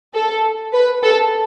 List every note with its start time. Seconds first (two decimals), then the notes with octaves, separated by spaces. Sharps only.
0.14 A4
0.74 B4
1.03 A4